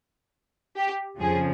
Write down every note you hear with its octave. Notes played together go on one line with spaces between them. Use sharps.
G4
F2 C#3 F3 G#4